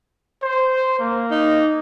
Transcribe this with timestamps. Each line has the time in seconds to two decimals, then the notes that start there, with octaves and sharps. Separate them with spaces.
0.43 C5
1.00 A#3
1.31 D#4